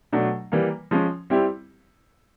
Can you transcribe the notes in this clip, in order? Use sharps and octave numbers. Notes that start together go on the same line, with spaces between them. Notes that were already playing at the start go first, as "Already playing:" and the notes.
B2 F#3 A3 D4
E3 G3 A#3
F3 G#3 C#4
G3 C4 E4 G4